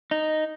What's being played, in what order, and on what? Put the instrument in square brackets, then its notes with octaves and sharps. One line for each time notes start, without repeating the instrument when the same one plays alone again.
[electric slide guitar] D#4